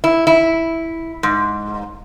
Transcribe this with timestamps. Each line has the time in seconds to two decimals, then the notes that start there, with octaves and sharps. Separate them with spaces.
0.04 E4
0.27 E4
1.23 G#2